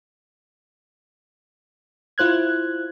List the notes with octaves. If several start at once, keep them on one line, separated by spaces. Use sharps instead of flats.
E4 F4 C5 F#6 G#6